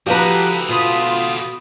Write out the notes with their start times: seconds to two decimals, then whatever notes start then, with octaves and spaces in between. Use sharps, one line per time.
0.06 F3 F#4 G4 A4 B4 A#5
0.69 B2 F4 B5 D#6